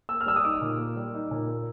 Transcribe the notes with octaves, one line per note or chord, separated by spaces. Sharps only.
A#3 E6
F6
G3 E6
D#6
D#4 D6
A#2
A#3
G3
D#4
A#2
A#3